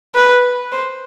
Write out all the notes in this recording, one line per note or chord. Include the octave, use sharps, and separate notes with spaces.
B4
C5